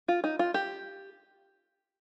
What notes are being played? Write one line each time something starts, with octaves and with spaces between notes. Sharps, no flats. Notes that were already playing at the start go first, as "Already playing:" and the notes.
F4
D#4
F4
G4